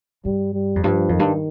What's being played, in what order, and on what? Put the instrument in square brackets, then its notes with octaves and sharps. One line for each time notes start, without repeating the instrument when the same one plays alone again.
[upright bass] G2 [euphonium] G3
[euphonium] G3
[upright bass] F2
[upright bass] G2 [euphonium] F3
[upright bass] F2 [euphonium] D#3
[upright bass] G2